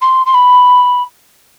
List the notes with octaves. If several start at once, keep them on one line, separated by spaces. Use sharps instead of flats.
C6
C6
B5